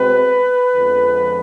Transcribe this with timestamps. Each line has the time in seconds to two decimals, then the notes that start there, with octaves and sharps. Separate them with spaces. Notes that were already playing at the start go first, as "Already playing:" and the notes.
Already playing: B2 G#3 C4 B4
0.75 F2 D3 F3 G#3 B3